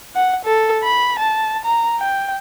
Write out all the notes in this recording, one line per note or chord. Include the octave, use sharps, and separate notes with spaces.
F#5
A4
B5
A5
A#5
G5